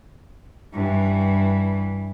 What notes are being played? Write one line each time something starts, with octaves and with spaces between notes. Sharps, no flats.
G2 E3